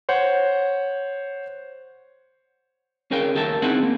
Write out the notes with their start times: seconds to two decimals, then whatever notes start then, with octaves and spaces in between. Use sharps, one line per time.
0.09 C5 C#5 F#5
3.11 C#4 G#4 A#4 F5 G5
3.35 D#2 G4 A4 A#4 E5
3.62 C4 C#4 D#4 E4 G#4 F#5
3.83 A#3